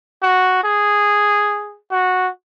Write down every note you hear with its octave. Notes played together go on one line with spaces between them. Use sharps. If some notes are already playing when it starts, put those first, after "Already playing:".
F#4
G#4
F#4